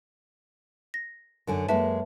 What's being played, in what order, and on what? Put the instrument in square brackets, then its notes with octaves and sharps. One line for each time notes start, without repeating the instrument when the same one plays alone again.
[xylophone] A#6
[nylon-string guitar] F#2 D3 G#5
[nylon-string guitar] F#2 G#3 A#3 [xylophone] B4 E5 A5